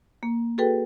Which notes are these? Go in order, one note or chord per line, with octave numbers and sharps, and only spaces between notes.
A#3
F#4 G#4 A4 B4 G5